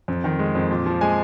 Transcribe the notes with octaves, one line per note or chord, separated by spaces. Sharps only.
F2
D#3
G#3
F2
A#2
F3
G#3 G#5